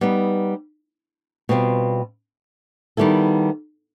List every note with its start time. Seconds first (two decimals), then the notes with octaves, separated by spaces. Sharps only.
0.01 G3 B3 D#4
1.49 B2 G3 C4 F4
2.97 D#3 G3 B3 E4 A4